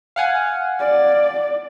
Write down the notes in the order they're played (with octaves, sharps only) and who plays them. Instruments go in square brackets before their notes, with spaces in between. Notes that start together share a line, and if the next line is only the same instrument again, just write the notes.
[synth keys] F5 F#5 G#5
[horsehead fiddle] D5